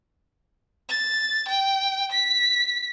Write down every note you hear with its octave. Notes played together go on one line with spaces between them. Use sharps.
A6
G5
B6